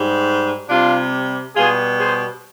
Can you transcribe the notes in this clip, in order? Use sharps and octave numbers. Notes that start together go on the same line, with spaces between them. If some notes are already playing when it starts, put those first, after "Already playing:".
Already playing: G#2 G3
C3 G3 D4 F4
B2 G3 F4 G#4
G#4 C5